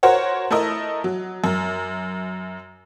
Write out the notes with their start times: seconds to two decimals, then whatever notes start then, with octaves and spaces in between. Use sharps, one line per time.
0.03 F#4 A#4 C5 C#5 F#5
0.51 A3 E4 A#4 D#5
1.04 F#3
1.44 F#2